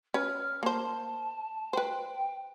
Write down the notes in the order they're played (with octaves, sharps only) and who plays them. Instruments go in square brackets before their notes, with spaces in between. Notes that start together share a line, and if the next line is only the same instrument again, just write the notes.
[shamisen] C#4 B4 [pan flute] F6
[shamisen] A#3 C5 [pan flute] A5
[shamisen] B4 C5 [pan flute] G5